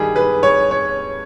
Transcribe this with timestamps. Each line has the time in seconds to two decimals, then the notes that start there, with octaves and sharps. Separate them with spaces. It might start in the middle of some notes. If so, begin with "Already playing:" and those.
Already playing: G2 D#3 G3 G#4
0.16 B4
0.43 C#5
0.71 C#5